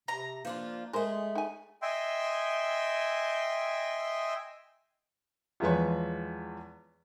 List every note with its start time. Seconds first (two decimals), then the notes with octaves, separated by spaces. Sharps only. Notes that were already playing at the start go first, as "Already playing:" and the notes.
0.08 C3 A#5
0.45 F3 A#3 D4 F4
0.93 G#3 A3 G#4 A#4 C5
1.35 D#4 G#5
1.82 D#5 E5 G5 G#5 C6 E6
5.60 E2 F3 G#3 B4 C#5